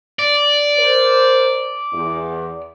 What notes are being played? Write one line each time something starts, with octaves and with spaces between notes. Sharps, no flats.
D5
A#4 C5
E2